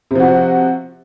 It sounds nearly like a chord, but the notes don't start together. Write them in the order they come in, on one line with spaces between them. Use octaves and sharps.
C3 F3 F#4